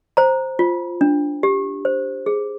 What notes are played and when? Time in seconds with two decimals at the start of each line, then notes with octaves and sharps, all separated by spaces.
0.17 C5 A#5
0.59 F4
1.01 D4
1.43 G4
1.85 C5
2.26 G#4